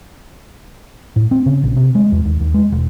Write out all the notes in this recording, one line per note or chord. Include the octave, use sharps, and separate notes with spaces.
A2
C4
C#3
A#1
C3
G#3
E2
D#2
D#2
G#3
E1